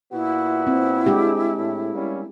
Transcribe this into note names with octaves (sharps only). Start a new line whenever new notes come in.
A#2 B3 E4 F#4
C4
G#3 D4 G4
A2
G3 A#3 C#4